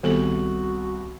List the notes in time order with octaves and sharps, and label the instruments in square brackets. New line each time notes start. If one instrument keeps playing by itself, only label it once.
[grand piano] C2 F#7 [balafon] D#3 B3 A4 [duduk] F#4